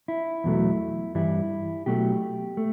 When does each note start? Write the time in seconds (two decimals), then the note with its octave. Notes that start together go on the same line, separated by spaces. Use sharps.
0.08 E4
0.44 E2 B2 F#3 A3
1.15 G2 E3 G3 E4
1.86 B2 F#3 A3 G4
2.57 A3